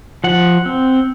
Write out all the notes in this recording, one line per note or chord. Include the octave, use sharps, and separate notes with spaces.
F3 F#5
C4